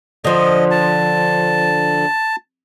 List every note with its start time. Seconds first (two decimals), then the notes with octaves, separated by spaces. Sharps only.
0.25 D3 F3 D#5
0.71 A5